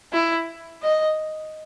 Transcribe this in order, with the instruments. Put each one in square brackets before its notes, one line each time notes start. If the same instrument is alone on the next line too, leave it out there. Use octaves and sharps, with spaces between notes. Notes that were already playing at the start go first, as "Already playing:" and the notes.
[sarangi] E4
D#5